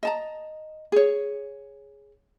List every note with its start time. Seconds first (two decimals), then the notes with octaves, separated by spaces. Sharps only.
0.03 D#5 A5 A#5
0.92 G#4 C#5